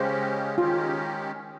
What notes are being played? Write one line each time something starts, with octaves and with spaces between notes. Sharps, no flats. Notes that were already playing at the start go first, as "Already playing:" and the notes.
Already playing: C#3 G#3 C#4 G4 C5
D#3 G#3 C#4 F4 G4